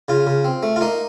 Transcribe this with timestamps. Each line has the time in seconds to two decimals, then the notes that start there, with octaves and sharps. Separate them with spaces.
0.08 C#3 F4
0.27 C#3
0.45 C4
0.63 A3
0.76 F4
0.81 A#3 D#4